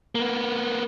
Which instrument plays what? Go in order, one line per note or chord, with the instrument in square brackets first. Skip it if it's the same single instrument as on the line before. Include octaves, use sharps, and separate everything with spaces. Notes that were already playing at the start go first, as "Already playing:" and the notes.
[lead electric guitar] A#3 B3